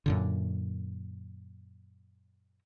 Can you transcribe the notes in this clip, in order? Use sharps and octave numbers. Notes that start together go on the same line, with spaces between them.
F#2 A#2 D3